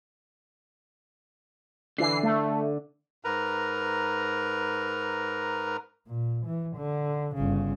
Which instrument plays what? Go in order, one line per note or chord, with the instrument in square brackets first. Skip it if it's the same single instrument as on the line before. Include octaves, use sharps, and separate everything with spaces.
[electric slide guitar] D3 [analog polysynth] E3 C7
[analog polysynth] A3
[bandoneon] G#2 A#4 B4 A#5
[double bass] A#2
E3
D3
G1 C#3